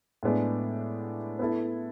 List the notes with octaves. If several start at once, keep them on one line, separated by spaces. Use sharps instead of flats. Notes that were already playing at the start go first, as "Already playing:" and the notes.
A2 G#3 B3 D4 G#4
B3 E4 A4